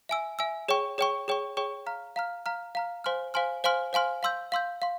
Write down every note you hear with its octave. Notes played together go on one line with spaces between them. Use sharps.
E5 G#5 E6
E5 G#5 E6
G#4 C#5 G5 C#6
G#4 C#5 G5 C#6
G#4 C#5 G5 C#6
G#4 C#5 G5 C#6
F5 A#5 F6
F5 A#5 F6
F5 A#5 F6
F5 A#5 F6
C5 F5 G#5 C6 F6
C5 F5 G#5 C6 F6
C5 F5 G#5 C6 F6
C5 F5 G#5 C6 F6
F5 C6 E6 G6
F5 C6 E6 G6
F5 C6